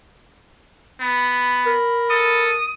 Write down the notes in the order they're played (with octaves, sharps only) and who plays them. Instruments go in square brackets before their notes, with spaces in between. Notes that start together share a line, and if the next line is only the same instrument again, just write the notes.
[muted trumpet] B3 [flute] B5
[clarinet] A#4
[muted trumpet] A4 [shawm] D#6